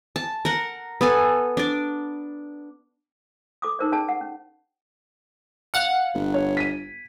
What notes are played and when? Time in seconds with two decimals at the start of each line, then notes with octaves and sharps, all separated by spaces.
0.16 A5
0.45 A#4 F#5
1.01 B3 A4 G#5
1.57 D4 D5
3.62 A4 D6 D#6
3.79 D#4 A4 A#4 C5 D5
3.92 C#4 G#4 D5 A5
4.09 F#5
4.21 C#4
5.74 F5 F#5 F#6 C#7
6.14 G1
6.34 C#5
6.57 B6 D#7